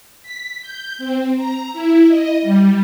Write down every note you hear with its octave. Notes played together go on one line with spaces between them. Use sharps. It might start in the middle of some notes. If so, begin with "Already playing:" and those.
B6
G6
C4
A#5
E4
D#5
G3